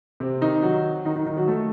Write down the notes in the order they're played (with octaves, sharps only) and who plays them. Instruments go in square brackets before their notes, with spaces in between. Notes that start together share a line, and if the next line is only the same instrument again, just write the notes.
[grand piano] C3 C4
D#3 D#4
F#3 F#4
D#3 D#4
D#3 D#4
D#3 D#4
F#3 F#4
A3 A4